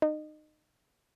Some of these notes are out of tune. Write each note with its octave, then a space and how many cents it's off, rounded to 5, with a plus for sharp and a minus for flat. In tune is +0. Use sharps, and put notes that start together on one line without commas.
D#4 -25